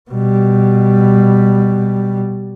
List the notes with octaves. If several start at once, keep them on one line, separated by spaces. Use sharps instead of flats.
B2 G3